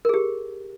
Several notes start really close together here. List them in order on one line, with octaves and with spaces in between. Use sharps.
A#4 G#4 G4